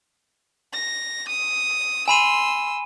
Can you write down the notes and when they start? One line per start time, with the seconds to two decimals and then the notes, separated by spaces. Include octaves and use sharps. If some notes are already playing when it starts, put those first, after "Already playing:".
0.73 A#6
1.29 D#6
2.08 G#5 B5 C6 E6 D#7